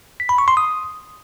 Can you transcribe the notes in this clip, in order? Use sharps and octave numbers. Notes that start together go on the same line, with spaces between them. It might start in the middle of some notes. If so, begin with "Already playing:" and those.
B6
B5
C#6
C6
D#6